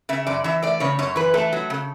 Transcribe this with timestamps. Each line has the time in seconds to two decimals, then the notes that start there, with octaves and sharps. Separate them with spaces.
0.09 C#3 E5
0.27 F#2 D5
0.44 E3 E5
0.62 A3 D5
0.80 C#3 C#5
0.99 F#2 C#5
1.16 E3 B4
1.34 A3 A4
1.53 F#3
1.70 C#3